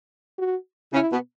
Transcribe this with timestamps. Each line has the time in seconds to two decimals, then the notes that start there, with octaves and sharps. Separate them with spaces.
0.39 F#4
0.93 C#3 C#4 E4
1.10 B2 B3